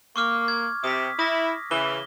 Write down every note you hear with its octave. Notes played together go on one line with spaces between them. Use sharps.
A#3 C#6 D6 F6
G#6
C3 D#6 B6
E4 D#6 A#6
C#3 E3 G7